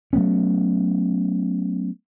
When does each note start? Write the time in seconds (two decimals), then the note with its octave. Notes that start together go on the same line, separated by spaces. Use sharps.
0.13 F#3 A3 B3 C#4